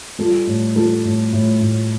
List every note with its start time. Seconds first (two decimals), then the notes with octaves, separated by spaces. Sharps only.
0.19 G3 F4 A4
0.47 A2
0.76 G3 F4 A4
1.05 A2
1.33 A2
1.61 A2